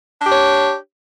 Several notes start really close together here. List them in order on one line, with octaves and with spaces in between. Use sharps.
D4 G4 C#5